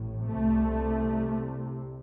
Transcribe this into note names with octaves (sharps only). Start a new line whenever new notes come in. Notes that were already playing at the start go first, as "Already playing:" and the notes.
Already playing: A1 A2
C3 A3
C2